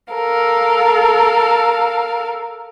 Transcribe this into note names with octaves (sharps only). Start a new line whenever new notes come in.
A4 A#4 F5